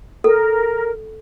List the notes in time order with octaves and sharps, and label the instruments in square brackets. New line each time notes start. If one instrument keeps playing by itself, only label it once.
[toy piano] A4 [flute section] A#4